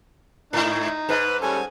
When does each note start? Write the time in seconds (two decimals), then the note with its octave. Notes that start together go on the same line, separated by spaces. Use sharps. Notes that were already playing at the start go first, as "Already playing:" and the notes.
0.53 G#2 D#4 E4
1.09 G#2 B4
1.42 G3 C#4 A4 G#5